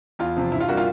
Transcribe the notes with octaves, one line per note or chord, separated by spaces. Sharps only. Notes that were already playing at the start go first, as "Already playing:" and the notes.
E2 F4
C3 F3
G2 E4
F4
D3 G3 A#3 F#4
F4